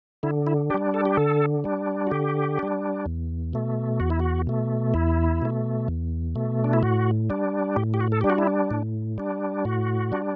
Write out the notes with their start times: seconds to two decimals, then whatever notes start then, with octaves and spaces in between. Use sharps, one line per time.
0.23 D3 E4
0.47 E4
0.70 D4 G4
0.74 G3
0.94 A4
1.05 G4
1.17 D3 A4
1.64 G3 D4
2.07 F#4
2.11 D3 G4
2.59 G3 D4
3.06 E2
3.53 B2 A3
4.00 E2 F#4
4.10 E4
4.19 F#4
4.47 B2 A3
4.94 E2 E4
5.42 B2 A3
5.88 E2
6.35 B2 A3
6.64 D4
6.73 E4
6.83 A2 F#4
7.30 G3 D4
7.76 A2 G4
7.94 G4
8.01 F#4
8.12 A4
8.21 G3 D4 G4
8.30 F#4
8.38 E4
8.47 D4
8.71 A2
9.18 G3 D4
9.65 A2 F#4
10.12 G3 D4